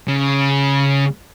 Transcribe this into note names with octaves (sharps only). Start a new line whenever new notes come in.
C#3